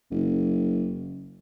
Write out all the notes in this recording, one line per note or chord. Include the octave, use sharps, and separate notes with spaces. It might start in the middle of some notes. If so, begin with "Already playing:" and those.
F#1